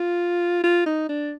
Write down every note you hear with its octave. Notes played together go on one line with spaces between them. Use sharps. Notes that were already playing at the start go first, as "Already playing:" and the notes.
Already playing: F4
F4
D#4
D4